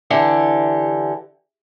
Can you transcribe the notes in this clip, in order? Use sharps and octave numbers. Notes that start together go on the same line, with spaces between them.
D3 E3 G4